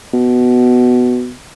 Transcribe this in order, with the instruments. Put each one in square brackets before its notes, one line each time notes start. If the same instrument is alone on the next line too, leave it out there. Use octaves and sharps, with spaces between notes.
[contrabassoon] B2